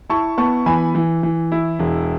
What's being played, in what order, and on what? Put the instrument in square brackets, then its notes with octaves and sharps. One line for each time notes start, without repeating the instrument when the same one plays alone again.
[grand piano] E4 A5 C#6
B3 A5 C#6
E3 G#5 B5
E3
E3
E4
E1